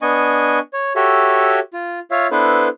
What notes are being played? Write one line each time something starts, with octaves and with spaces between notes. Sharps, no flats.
B3 D4 D#5 G#5 C#6
C#5
F#4 G4 A4 C#5 E5
F4
F4 C#5 E5 F5
B3 D4 E4 A4 B4 C5